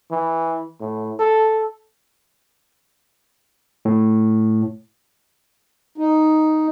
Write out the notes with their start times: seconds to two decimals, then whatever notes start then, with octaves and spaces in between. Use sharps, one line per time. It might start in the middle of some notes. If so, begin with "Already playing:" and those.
0.11 E3
0.81 A2
1.19 A4
3.85 A2
5.98 D#4